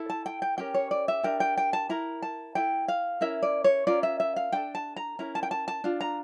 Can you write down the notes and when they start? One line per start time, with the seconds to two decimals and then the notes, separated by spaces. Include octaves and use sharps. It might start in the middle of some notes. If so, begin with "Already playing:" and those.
Already playing: E4 A4
0.10 A5
0.26 G5
0.42 G5
0.58 C#4 G4 A#4 G5
0.74 C#5
0.91 D5
1.08 E5
1.23 D4 G4 A#4 G5
1.40 G5
1.57 G5
1.73 A5
1.89 E4 A#4 A#5
2.22 A5
2.55 E4 A4 G5
2.88 F5
3.21 C#4 E4 A#4 E5
3.42 D5
3.64 C#5
3.87 C#4 F4 A#4 D5
4.03 E5
4.20 E5
4.36 F5
4.52 D4 A4 G5
4.75 A5
4.96 A#5
5.19 C#4 E4 A#4 A#5
5.35 A5
5.43 G5
5.51 A5
5.68 A5
5.84 D4 F4
6.01 A#5